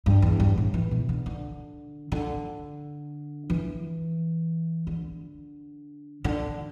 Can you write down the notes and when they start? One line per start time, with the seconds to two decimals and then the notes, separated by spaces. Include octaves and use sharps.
0.06 G2
0.22 E2
0.40 G2
0.58 A2
0.74 E3
0.91 B2
1.09 D3
1.26 D3
2.12 D3
3.50 E3
4.87 D3
6.24 D3